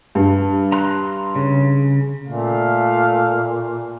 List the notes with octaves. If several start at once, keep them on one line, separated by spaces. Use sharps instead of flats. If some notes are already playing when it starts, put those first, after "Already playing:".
G2
A#5 C6 F#6
C#3
A#2 A3 F5